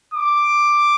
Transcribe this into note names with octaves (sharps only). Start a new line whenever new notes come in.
D6